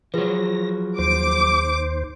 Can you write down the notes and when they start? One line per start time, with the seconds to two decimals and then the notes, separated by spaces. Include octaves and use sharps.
0.14 F3 F#3 G#4 B4 A#6
0.99 D#2 C5 D6